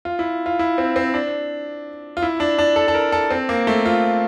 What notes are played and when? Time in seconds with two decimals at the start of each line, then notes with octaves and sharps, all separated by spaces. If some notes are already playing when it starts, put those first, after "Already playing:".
0.05 F4
0.19 E4
0.46 F4
0.59 E4
0.78 C4
0.96 C4
1.14 D4
2.17 F4
2.22 E4
2.40 D4
2.58 D4
2.76 A4
2.88 A4
2.95 A#4
3.12 A4
3.30 C4
3.49 A#3
3.67 A3
3.85 F4